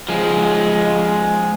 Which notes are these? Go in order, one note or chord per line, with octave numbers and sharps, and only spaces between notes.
F3 G#3